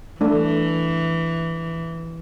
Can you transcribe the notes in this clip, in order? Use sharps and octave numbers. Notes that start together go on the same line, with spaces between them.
E3 A3 D4